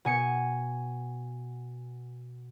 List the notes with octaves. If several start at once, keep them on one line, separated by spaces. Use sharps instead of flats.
B2 G#5 C#7